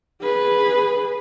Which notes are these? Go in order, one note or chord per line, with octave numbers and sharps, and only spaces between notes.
G#4 B4